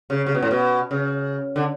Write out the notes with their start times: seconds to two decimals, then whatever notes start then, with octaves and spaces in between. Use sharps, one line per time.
0.10 C#3
0.26 C#3
0.34 B2
0.42 A2
0.51 B2
0.91 C#3
1.56 D3